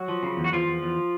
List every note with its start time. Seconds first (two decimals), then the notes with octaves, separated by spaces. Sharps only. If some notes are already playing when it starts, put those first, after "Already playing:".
Already playing: F#3 F#4
0.08 F3
0.23 C#3
0.37 E2
0.44 F#4
0.52 E2 F3 F4
0.67 E2
0.82 E2